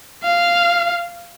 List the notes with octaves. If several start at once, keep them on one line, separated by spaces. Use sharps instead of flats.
F5